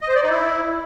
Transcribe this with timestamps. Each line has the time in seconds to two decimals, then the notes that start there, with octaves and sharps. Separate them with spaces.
0.01 D#5
0.08 C5
0.15 D5
0.23 D#4
0.30 E4